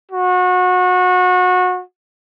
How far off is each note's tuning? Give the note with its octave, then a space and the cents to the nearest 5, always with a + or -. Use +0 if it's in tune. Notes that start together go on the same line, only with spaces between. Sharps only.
F#4 -25